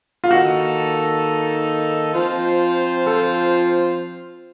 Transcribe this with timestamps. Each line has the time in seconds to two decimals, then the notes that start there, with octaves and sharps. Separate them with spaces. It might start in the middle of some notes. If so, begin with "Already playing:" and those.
0.24 F4
0.30 D#3 A#3 D#4 F#4 A4
2.14 F3 C4 F4 C5
3.07 A4